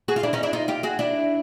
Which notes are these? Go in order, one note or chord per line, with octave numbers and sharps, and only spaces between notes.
F#4 G#4
F4
D4 E4
C#4 D#4
D4 E4
D#4 F4
F4 G4
F#4 G#4
D4 E4